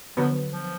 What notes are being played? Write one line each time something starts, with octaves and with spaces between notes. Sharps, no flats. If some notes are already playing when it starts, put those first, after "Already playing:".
D3 F3 F#3 B3
F3